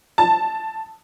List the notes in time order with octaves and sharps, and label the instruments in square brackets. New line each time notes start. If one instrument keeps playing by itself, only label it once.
[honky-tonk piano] A5